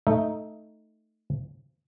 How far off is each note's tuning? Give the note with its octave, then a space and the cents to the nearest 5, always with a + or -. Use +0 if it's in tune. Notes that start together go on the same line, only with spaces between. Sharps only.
A3 +0 D#4 +0 E5 +0